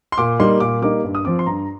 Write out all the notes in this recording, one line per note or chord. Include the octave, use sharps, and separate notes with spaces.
C6
A#2 D6
G3 A#3 D#4 C6
A#2 D6
G3 A#3 D#4 D6
G2
D#6
F3 C4 D6
C6
G2 A#5